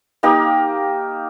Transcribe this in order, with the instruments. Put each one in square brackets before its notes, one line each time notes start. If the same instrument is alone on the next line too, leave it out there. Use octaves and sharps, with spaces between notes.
[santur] A#3 D#4 G4 A#4